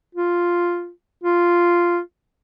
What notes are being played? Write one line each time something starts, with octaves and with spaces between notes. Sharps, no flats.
F4
F4